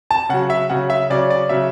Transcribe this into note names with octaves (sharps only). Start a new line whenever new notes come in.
A5
C#3 F#3 F#5
E5
C#3 F#3 F#5
E5
C#3 F#3 D5
D5
C#3 F#3 E5